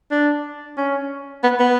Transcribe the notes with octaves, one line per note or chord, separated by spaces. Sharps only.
D4
C#4
B3
B3